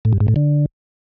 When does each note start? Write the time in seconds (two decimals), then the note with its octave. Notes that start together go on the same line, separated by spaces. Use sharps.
0.05 A2
0.13 G2
0.20 G#2
0.28 A2
0.36 D3